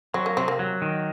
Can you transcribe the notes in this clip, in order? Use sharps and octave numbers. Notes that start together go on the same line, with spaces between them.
F#3 C4
A#3
C3 C4
A#3
F#3
D#3